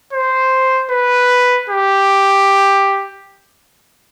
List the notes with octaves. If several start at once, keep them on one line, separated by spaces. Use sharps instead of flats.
C5
B4
G4